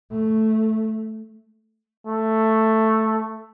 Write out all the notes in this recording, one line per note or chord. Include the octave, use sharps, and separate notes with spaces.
A3
A3